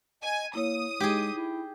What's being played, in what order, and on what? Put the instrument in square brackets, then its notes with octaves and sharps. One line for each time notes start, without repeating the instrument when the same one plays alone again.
[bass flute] D#5 [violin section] G#5
[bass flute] A#3 [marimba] E4 C#5 [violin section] D#6
[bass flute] G#3 [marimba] D#4 [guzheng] G4 G#4
[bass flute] E4